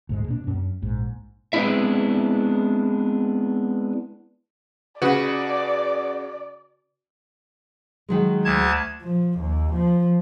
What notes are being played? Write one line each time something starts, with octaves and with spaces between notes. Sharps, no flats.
D2 G#2 G#3
B2 A#3 D4
F#2 C#4
A#1 G#2
G#3 B3 C4 D4 E4 E5
C#3 F#4 B4 D5
D#3 F#3 G#3
D2 A5 G#6
F3
D#2
F3